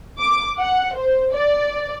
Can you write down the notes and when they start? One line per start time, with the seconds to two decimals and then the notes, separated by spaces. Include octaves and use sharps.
0.19 D6
0.59 F#5
0.96 C5
1.33 D5